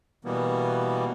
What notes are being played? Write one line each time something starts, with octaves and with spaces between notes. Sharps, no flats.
B2 E3 G3 A#3 B3